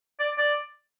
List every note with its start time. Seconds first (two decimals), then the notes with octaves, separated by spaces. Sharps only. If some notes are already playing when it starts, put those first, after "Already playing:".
0.19 D5
0.38 D5